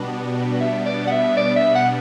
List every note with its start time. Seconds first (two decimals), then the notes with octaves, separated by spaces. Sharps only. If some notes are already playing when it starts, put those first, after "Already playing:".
Already playing: B2 G3 B3 D4 F#4
0.60 E5
0.85 D5
1.07 F#5
1.11 E5
1.37 D5
1.56 E5
1.75 F#5